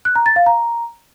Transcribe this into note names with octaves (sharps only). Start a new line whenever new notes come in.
F#6
A#5
A6
F5
A#5